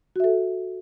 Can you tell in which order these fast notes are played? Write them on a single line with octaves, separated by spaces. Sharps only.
F#4 E5 A4